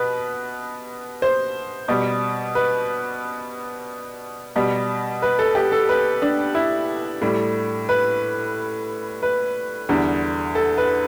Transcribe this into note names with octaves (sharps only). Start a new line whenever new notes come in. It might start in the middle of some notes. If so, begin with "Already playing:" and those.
Already playing: B2 B4
C5
B2 G3
B4
B2 G3
B4
A4
G4
A4
B4
D4
E4
A2 G3
B4
B4
E2 D3 G3
A4
B4